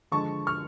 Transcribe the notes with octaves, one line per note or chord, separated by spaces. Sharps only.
D3 F3 G#3 A5 C#6
C#6 F6